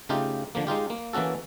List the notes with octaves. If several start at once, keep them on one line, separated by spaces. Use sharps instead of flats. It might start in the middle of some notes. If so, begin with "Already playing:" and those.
C#3 A3 D#4 F4 G4
D3 F3 A#3
G#3 D#4 F4 G4
A#3
E3 A#3 C#4 F#4 A4